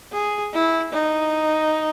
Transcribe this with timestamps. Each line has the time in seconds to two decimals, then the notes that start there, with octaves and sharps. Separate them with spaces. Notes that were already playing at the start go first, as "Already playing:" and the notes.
0.13 G#4
0.53 E4
0.93 D#4